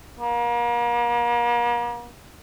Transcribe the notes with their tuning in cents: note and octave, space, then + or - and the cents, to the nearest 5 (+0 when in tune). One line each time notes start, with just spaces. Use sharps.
A#3 +40